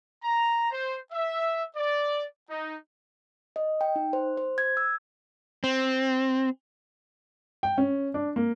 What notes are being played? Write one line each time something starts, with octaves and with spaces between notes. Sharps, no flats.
A#5
C5
E5
D5
D#4
D#5
G5
D#4
C5
C5
G#6
E6
C4
G5
C#4
D4
A#3